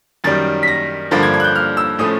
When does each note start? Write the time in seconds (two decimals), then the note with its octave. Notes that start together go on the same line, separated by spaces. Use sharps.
0.24 F#2 D#3 G3 A6
0.63 B6
0.68 A#6
1.11 G2 D3 F3 A#3 A6
1.23 G#6
1.34 G#6
1.40 F#6
1.44 G6
1.55 F6
1.77 E6
1.99 A2 F3 A3 C#4 D#6